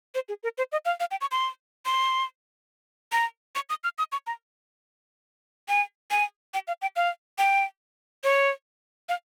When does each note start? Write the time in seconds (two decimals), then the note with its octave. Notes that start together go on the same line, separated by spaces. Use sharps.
0.15 C5
0.29 G#4
0.43 A#4
0.58 C5
0.72 D#5
0.85 F5
1.00 F5
1.11 G5
1.21 C#6
1.31 C6
1.86 C6
3.12 A#5
3.55 C#6
3.70 D#6
3.84 F6
3.98 D#6
4.12 C#6
4.27 A#5
5.68 G#5
6.11 G#5
6.54 G5
6.68 F5
6.82 G5
6.96 F5
7.38 G5
8.24 C#5
9.09 F5